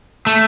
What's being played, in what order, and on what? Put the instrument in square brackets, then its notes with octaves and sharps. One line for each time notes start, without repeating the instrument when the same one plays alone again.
[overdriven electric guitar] A3